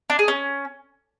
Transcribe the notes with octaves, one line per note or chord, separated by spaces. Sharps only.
D4
G#4
C#4